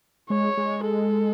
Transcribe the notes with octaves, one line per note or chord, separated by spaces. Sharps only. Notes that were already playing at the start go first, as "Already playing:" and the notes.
G#3 C#5
G#3
A4